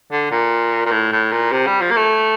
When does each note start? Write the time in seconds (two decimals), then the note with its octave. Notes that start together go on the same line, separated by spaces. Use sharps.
0.12 D3
0.31 A#2
0.86 A#2
0.91 A2
1.12 A2
1.32 A#2
1.52 C3
1.67 G3
1.82 F3
1.91 A#3
1.97 A3